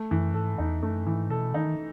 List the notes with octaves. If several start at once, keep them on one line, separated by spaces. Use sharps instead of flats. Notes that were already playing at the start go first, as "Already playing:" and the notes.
Already playing: A3
F#2 E3
G#2 A4
E2 D#4
F#2 A3
G#2 E3
B2 A4
D#3 D#4